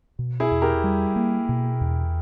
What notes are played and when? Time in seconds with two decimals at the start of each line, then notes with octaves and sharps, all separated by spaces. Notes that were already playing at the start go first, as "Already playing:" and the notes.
0.19 B2
0.40 E4 G#4
0.51 E2
0.62 G4 A#4
0.84 G3
1.16 A#3
1.49 B2
1.81 E2